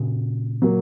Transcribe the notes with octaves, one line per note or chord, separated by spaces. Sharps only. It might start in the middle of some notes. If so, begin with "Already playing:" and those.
Already playing: A#2 C#3
F#3 A#3